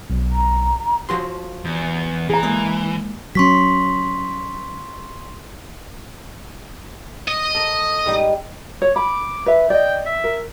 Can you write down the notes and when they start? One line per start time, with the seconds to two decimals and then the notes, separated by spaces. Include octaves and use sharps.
0.10 B1
0.32 A#5
1.09 F3 F#4 C6
1.65 E2
2.29 E3 G#4 A#5
2.43 G#3 A#3
3.35 F#3 C#4 C6 C#6 B6
7.28 D#5
7.55 A4 A#5
8.06 G#2 G3 D#4
8.82 C#5
8.96 B5 D6
9.46 B4 E5
9.70 D5 D#5 G5
10.06 E5
10.24 A#4